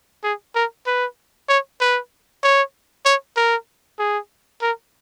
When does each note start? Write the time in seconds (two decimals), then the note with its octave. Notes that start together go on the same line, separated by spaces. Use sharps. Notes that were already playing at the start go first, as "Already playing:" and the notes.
0.24 G#4
0.55 A#4
0.87 B4
1.49 C#5
1.81 B4
2.43 C#5
3.06 C#5
3.37 A#4
3.99 G#4
4.62 A#4